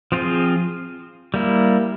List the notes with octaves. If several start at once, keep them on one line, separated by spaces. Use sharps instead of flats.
F3 C4 F4 G#4
G3 A#3 E4